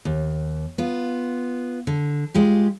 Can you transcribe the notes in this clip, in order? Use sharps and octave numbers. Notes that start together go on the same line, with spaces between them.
D#2
B3 F4
D3
G#3 F4 G4